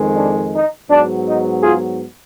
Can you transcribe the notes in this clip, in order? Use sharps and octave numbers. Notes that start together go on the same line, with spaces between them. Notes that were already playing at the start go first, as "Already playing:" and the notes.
Already playing: F2 D#3 G#3
D4
D#4
G#2 F#3 B3 D4
D#4
F4 G#4